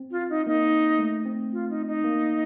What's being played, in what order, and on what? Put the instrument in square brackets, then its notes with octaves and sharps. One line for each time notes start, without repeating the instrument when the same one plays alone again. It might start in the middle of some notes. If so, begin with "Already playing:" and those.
Already playing: [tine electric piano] C4
[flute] F4
D#4
[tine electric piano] A#3 [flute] D#4
[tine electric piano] A3
C4
[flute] F4
D#4
D#4
[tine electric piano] A#3